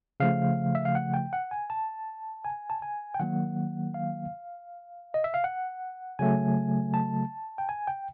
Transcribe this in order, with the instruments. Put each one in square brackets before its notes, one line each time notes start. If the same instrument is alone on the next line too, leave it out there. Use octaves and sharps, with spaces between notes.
[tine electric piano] C#3 F3 A3 F5
E5
F5
F#5
G5
F#5
G#5
A5
G#5
A5
G#5
G5
D#3 F#3 A#3 F#5
F5
D#5
E5
F5
F#5
C#3 F#3 A3 G#5
A5
G5
G#5
G5